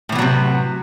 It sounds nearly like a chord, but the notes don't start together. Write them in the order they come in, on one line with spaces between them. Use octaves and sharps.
A2 E3 B3 F#3 C3